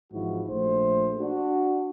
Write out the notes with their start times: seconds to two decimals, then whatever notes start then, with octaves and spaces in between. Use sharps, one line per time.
0.12 G#1 G#2 E3 F3 E4 F#4
0.48 A#1 A3 C5
1.19 D4 F#4